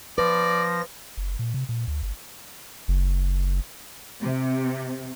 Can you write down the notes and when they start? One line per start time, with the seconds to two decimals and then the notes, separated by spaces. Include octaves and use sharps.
0.18 F3 B4 D5 A#6
1.17 F#1
1.39 A#2
1.54 C3
1.69 A#2
1.87 D2
2.03 G1
2.88 F#1
4.21 C3